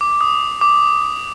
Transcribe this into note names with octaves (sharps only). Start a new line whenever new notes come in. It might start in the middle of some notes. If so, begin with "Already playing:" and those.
D6
D6
D#6
D6